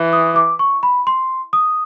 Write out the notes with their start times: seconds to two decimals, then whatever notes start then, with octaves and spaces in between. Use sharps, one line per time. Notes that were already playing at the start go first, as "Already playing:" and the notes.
Already playing: E3
0.13 D#6
0.36 D6
0.59 C#6
0.83 B5
1.07 C6
1.53 D#6